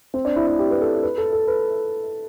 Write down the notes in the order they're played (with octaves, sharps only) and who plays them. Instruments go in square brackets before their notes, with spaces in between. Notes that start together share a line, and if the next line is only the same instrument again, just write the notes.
[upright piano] C4
D4
E4
E4
G4
B4
A4
B4
A4
A4
B4